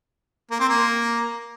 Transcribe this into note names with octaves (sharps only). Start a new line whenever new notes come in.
A#3
C4
A#3